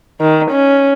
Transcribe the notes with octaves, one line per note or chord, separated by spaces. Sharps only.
D#3
C#4